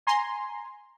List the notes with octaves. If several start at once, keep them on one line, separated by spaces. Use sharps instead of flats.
G#5 A#5 C6